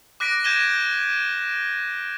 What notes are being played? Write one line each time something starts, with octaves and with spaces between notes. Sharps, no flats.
D6 F#6 A#6 B6 D7
G6 G#6 A#6 D#7 E7 G7